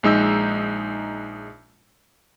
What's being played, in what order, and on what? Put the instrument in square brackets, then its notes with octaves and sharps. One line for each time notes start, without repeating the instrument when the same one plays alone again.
[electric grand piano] A#1 G#3 D#4 E6 G6